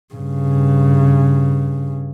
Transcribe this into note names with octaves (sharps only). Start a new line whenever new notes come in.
G2 C#3